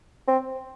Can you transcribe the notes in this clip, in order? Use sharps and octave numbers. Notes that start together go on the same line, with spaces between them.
C4